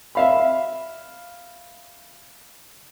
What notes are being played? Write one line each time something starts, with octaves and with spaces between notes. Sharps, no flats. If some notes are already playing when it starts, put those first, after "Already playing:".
E5 F5 B5